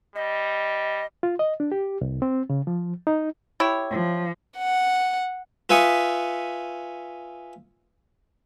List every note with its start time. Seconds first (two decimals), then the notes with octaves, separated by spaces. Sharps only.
0.15 G3 D#5
1.23 F4
1.39 D#5
1.60 D4
1.72 G4
2.01 C2
2.22 C4
2.50 C#3
2.67 F3
3.07 D#4
3.60 E4 G4 C#5
3.90 F3
4.58 F#5
5.69 F4 B4 E5 G#5 C#6 D#6